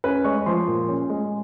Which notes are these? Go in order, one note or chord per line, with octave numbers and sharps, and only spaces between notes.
C#4 B4 B5
G#3 C#5 C#6
F3 C5 C6
A#2
C#4
G#3